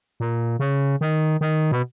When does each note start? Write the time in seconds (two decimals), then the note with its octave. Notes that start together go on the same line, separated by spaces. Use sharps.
0.20 A#2
0.59 C#3
1.01 D#3
1.41 D#3
1.72 B2